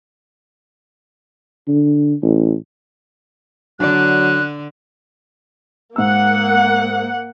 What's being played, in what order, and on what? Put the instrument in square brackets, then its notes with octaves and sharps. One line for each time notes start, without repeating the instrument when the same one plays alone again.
[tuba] D3
A1
[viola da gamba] D3 [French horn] F#3 [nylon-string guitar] D4 D5 [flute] F#6
[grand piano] G#2 E6 [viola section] A#3 F#5